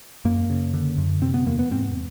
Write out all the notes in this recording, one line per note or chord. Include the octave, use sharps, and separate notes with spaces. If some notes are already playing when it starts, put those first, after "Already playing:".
F#2 A#3
C#3
D3
F#2
C3 C4
B3
E2 A#3
B3
G#2 C4